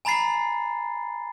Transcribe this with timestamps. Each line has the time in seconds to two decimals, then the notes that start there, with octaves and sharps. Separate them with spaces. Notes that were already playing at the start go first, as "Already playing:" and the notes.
0.05 G#5 A#5 B5 A6 C7